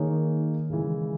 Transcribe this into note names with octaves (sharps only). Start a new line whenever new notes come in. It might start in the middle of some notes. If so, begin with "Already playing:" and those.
Already playing: D#3 A#3 D#4 G#4 C#5
C#3 E3 G#3